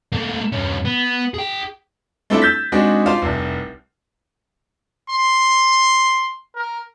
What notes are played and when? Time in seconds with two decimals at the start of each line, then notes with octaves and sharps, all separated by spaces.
0.12 A3 A#3
0.52 G2 C#4
0.85 B3
1.34 G#4 G5
2.30 A3 C4 D4 E4 F4 A4
2.42 E6 G6 A6 B6
2.72 G#3 C4 D4 D#4 F#4 G#4
3.06 F4 C5 D5 F5 A5
3.22 F1 C2
5.10 C6
6.55 A#4